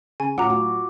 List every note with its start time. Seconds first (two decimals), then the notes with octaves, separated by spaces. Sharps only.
0.20 C#3 G#5
0.38 A2 F#3 F4 F#5 A#5 D6
0.50 F#4